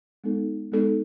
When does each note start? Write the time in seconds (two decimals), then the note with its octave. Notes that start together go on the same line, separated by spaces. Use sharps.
0.24 G#3 B3 D#4 A4
0.72 G#3 B3 D#4 A4